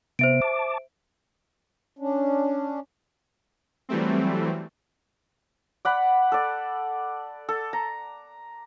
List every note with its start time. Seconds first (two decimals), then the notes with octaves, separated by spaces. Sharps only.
0.19 C3 B3 C5 E5 D7
0.42 A5 D6
1.99 C#4 D4
3.89 E3 F#3 G3 A3 C4
5.85 D5 F#5 B5
6.32 A4 D5
7.49 A4
7.73 A#5